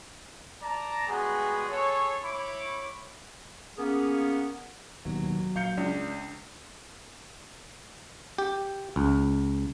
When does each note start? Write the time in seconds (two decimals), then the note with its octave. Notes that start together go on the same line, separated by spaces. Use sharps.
0.63 D5 A5 A#5
1.08 G3 G#3 B3 F#4 G#4
1.70 G#4 A4 C#5
2.25 E4 C#5 B5 C6 D6
3.77 A#3 B3 C#4 G#4
5.05 D1 D#2 B2 F#3
5.56 A#1 F5 G6 C#7
5.77 C#2 D4
8.38 G4
8.96 C#2